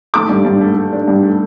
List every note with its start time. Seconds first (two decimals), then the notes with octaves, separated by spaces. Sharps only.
0.14 A3 D6
0.29 G2
0.45 G2
0.61 A3
0.76 A3
0.93 D4
1.08 G2
1.23 A3